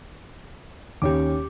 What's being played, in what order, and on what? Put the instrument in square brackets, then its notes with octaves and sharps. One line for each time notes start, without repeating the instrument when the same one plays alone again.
[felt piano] D#2 C#4 [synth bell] G4 D6